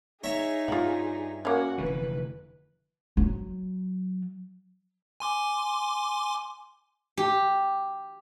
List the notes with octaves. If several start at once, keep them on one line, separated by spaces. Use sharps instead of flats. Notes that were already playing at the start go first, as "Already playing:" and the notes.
D#4 G#4 C#5 E5 A#5
G2 F4 F#5
A#3 C#4 F#4 F#5
F1 D3 E3 B4
F#3
G#5 C6 D6
G4